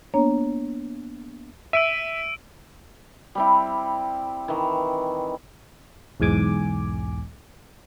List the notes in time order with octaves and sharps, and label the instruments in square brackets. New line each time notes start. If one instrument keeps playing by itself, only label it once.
[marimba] A#3 B3 D4 C#5 A#5
[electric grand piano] E5 [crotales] E6 D7 D#7
[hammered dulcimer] G3 C4 E4
D#3 E3
[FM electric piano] B1 E2 G#2 G#5 D6